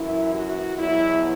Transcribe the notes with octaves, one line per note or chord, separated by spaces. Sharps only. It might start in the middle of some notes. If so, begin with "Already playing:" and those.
Already playing: F#2 E3 E4
F#4
E2 B2 F#3 E4